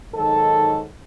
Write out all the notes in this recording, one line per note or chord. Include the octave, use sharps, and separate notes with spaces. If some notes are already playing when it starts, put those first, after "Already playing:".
G#2 D#3 F#3 A4